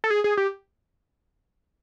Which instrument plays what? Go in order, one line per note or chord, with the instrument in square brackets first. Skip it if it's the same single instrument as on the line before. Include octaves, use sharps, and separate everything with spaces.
[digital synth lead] A4
G#4
G#4
G4